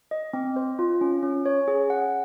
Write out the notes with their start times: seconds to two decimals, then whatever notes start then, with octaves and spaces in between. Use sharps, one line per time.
0.11 D#5
0.33 C4
0.56 C5
0.79 F4
1.01 C#4
1.23 C#4
1.46 C#5
1.68 G#4
1.90 F#5